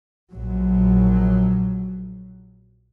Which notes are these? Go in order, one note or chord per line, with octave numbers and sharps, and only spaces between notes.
A#1 F#3